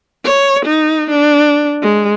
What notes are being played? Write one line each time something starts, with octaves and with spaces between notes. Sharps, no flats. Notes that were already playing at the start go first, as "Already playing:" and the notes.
C#5
D#4
D4
G#3